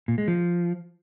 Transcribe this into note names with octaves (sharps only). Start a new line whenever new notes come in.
A#2
G#3
F3